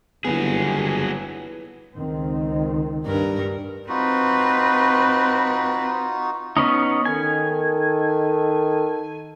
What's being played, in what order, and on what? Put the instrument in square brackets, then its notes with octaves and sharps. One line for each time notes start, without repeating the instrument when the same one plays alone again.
[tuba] G1 [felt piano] E3 B3 [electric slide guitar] F#3 G#4
[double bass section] C#2 D#3 C4
[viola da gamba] G2 A#4
[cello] C4 B4 [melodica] D#4 F4 F#4
[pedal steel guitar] B3 C#4 D#4
[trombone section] D#3 A4 [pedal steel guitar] G#5